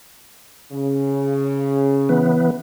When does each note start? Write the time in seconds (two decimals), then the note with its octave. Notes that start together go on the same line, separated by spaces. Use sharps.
0.72 C#3
2.09 E3 B3